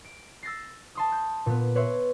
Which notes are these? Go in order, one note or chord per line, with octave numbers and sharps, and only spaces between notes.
D7
E6 A6 A#6 C7
A5 C6 D#6
G6
A#2 B3
B4 C#5 E5 C6